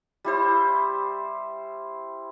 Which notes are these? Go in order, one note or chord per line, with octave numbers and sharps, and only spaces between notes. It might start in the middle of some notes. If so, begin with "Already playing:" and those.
G3 E4 C5